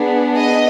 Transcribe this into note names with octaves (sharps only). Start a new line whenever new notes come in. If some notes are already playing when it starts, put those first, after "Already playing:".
Already playing: B3 D4 G#4
D#5